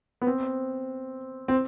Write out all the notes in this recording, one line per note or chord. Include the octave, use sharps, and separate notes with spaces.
B3
C4
C4